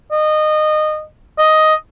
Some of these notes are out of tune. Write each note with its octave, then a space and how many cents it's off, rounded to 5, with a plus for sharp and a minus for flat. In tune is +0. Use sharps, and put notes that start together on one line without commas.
D#5 -20
D#5 +5